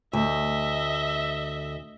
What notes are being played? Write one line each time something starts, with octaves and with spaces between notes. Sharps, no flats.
D2 D#5 E5